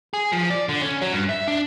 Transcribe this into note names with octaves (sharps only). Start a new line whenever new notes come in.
G#4
F3
D5
D3
C#4
F#3
G2
E5
D4